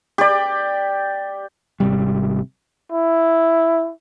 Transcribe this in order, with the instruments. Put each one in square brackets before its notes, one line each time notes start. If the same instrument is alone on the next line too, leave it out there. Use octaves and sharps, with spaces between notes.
[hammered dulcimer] G4 D5
[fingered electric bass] G#1 C3 G3
[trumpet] E4